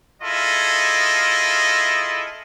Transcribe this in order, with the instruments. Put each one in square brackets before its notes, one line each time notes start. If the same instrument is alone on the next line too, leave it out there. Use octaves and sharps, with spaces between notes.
[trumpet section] E4 F4 G#4 A4 D#5